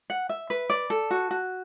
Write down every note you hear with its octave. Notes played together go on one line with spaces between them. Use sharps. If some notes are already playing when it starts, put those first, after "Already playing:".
F#5
E5
B4
D5
A4
F#4
F#4